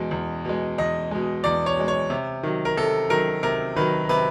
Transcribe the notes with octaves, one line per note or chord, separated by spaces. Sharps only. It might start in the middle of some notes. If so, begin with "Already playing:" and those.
Already playing: E2 B2 G#3
E2
B2 G#3
E2 D#5
B2 G#3
E2 D5
C#5
B2 G#3
C#5
C3
D#3 F#3
A#4
C3 A4
D#3 F#3 A#4
C3 A#4
D#3 F#3 B4
C3 B4